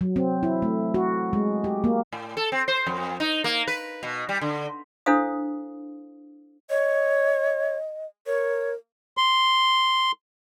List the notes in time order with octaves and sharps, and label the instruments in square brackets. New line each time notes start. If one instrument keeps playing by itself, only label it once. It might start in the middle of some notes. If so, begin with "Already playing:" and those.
[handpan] F#3
C4
E4
A3
F#4
G#3
G4
A#3
[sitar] A2
A4
C4
C5
F2
D#4
A#3
B4
B2
G3
D3
[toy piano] D4 E4 A4 C5 F5 D#6
[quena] C#5 [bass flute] D#5
[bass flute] A#4 [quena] C#5
[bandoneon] C6